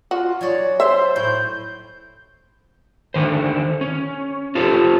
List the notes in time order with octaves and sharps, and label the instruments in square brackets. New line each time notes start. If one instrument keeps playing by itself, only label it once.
[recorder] F4 [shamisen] F#4
[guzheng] F#3 G#4 C#5 [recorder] D5
[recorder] C5 [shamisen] E5 [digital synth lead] C6
[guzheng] A2 [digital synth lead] G6
[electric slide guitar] D3 D#3 C5
C#4
F4 G4 A4 C5